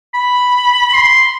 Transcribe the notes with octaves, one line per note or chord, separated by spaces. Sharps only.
B5
C6